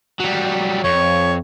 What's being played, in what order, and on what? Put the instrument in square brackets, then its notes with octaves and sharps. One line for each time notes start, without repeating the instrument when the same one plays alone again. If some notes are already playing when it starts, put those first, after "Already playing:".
[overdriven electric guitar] F#3 G3
[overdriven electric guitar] F2 [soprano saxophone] C#5